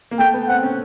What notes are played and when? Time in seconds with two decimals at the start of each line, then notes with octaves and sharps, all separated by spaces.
0.11 A#3
0.19 A3 G5
0.34 B3
0.48 C4 F#5
0.63 C#4